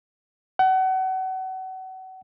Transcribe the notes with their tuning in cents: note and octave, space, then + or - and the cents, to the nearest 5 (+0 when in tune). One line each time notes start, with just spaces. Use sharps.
F#5 +30